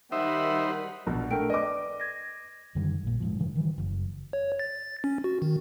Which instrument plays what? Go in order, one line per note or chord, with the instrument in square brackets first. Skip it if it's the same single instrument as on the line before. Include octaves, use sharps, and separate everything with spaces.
[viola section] D#3 G3 B5 [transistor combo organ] D#4 C5 [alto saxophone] E5 [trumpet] F#5
[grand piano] A#1 B2
[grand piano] A3 A#4 [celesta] D4 G5 D7
[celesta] B4 D5 [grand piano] D#5 D6
[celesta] G#6 A#6
[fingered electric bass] F#2 D3 D#3 G3
A#1 A#2
F1 G#2 F3
G2 C#3 E3 F3
D#3 E3 G3
F#1
[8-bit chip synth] C#5
A6
C#4
F#4
D#3